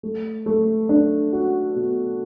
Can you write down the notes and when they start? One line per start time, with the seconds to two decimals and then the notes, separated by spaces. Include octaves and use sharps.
0.03 A3
0.46 A3
0.89 D4
1.33 F#4
1.76 B2